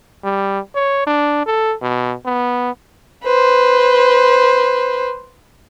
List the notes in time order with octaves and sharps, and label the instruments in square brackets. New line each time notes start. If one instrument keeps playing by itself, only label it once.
[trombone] G3
C#5
D4
A4
B2
B3
[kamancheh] B4 C5